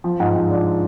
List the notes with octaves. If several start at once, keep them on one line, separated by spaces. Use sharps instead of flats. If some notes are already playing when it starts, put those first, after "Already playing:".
F3
G#2
G#2
D4